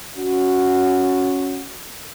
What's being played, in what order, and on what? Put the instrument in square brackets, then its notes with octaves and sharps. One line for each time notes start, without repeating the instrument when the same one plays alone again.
[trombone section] C#4 F#4